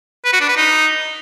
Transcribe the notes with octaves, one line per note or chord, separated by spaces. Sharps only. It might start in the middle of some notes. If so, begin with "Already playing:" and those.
B4
F#4
D4
B4
D#4